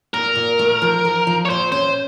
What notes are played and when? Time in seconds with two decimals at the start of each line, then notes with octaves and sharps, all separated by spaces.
0.14 A#2 A#4
0.35 A#2
0.59 A3
0.82 F3
1.05 F3
1.27 F3
1.45 C#5
1.49 A#2 C5
1.72 C#4 C5